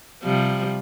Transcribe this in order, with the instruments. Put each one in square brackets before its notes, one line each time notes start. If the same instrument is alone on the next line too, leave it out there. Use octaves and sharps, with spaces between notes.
[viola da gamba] C3 F3 G3